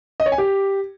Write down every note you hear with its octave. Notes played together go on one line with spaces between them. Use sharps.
D#5
C#5
G#5
G4